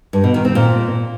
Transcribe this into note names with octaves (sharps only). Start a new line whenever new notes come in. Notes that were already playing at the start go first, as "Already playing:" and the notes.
G2
B2
D#3
C4
A#2